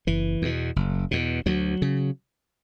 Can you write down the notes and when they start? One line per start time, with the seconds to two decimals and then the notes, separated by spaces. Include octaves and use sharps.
0.07 F#1 E3
0.42 E2 B2
0.76 F#1
1.11 E2 B2
1.46 D2 F#3
1.82 C#3